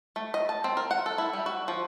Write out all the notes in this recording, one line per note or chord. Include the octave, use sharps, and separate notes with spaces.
A3
D#5
A5
C4
A#4
F#5
A4
E4
G3
F#4
F3